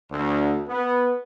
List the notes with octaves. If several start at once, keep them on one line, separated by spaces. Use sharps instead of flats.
D2
B3